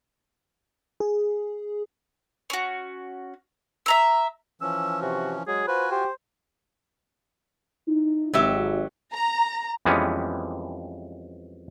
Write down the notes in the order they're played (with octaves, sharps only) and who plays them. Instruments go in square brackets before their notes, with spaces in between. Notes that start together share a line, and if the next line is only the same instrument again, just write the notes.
[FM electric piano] G#4
[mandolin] C#4 F#4
E5 A#5 E6
[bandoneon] E3 F3 C#4 [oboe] E6
[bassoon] C3 [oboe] F#4
[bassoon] F#3 [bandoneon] G#3 [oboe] G#4
[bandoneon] F4 F#4 G#5 [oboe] B4 [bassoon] C5
[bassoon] G4 [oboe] C5
[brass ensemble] D#4 E4
[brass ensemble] G#1 [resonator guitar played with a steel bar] F#3 G4 E5
[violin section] A#5
[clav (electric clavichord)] F2 E3 G3 G#3 B3 C#4